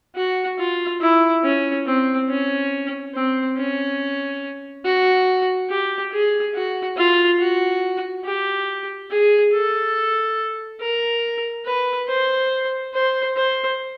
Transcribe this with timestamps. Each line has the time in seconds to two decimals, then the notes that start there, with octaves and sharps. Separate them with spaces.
0.16 F#4
0.58 F4
1.01 E4
1.44 C#4
1.86 C4
2.29 C#4
3.14 C4
3.56 C#4
4.85 F#4
5.70 G4
6.12 G#4
6.54 F#4
6.97 F4
7.40 F#4
8.25 G4
9.11 G#4
9.53 A4
10.81 A#4
11.65 B4
12.08 C5
12.94 C5
13.36 C5